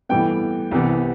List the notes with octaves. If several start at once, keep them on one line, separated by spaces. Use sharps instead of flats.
A2 E3 G3 B3 G5
C2 C3 E3 B3